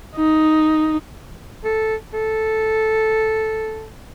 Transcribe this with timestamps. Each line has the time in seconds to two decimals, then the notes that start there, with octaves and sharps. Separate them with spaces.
0.15 D#4
1.64 A4
2.14 A4